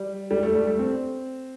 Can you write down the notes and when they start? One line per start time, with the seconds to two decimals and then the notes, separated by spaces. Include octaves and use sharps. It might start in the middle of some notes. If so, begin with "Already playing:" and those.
Already playing: G3
0.31 G3
0.43 A3
0.55 G3
0.67 A3
0.79 C4